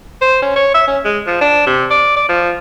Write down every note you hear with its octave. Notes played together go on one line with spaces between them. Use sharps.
C5
C#4
C#5
E5
C#4
G#3
F3
D4
C3
D5
D5
F3